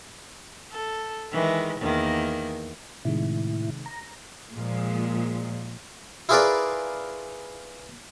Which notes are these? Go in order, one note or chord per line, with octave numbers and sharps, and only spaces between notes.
A4
D#3 E3 G#3
E2 D#3 A#3
A2 C3 D#3 G#3 E4
A#5
A#2 F3 G#3
E4 F4 G#4 A#4 B4 D5